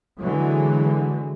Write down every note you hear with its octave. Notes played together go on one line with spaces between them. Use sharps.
D3 E3 F#3 G#3